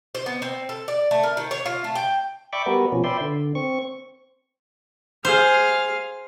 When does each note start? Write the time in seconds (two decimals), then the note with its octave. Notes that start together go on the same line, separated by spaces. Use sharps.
0.15 C5
0.26 B3
0.42 C4
0.69 A4
0.88 D5
1.11 A3
1.23 A#4
1.37 D#3
1.51 C#5
1.66 F4
1.84 A3
1.95 G5
2.53 D5 E5 G5 B5 C#6 D6
2.66 G3 B3 F#4 A#4 B4
2.92 B2 F3 C#4
3.04 B4 D5 E5 G5 C6
3.21 D3
3.55 C4 C#6
5.25 G#4 C5 F5